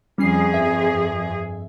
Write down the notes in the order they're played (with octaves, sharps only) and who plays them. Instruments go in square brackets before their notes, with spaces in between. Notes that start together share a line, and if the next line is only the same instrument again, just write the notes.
[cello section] F2 G#4 [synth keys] G3 C#4 C7
[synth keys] G2 E5